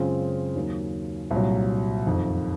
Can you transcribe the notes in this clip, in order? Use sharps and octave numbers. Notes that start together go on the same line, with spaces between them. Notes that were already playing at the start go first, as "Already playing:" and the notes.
Already playing: F#2 C#3 G#3 C4 F4
D#2 D#3 F#3 A#3
C2 A#2 F#3
F#1 F2 D#3